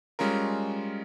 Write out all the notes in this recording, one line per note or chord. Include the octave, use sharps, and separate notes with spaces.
G3 G#3 C#4 F4 A#4